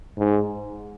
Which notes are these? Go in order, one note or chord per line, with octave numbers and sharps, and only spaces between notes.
G#2